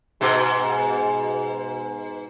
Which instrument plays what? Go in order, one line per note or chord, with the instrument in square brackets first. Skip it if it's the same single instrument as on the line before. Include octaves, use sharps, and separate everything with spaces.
[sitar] G#2 B2